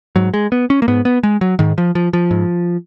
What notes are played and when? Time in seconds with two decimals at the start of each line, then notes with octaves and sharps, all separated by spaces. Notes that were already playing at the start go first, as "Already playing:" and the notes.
0.16 G#2 F#3
0.34 G#3
0.52 B3
0.70 C#4
0.82 A#3
0.88 G#2 B3
1.05 B3
1.23 G#3
1.41 F#3
1.59 G#2 D#3
1.78 F3
1.95 F3
2.13 F3
2.31 G#2